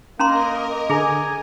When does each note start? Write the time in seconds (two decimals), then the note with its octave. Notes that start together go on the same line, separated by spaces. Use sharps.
0.19 A#3 C#4 A#4 D#5 A#5 C6
0.90 D3 G#4 G#5 A#5